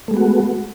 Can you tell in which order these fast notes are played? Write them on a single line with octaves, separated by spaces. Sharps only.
A3 G#3 B3 F#4